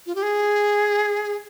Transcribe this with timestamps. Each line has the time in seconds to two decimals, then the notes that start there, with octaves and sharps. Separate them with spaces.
0.06 F4
0.15 G4
0.22 G#4